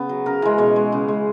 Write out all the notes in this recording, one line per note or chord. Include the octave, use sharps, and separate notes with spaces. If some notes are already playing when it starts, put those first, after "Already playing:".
Already playing: C#3 B3
F#3
C#3 A#4
E3 G#3
B2 C#5
G#3
C#3
G#3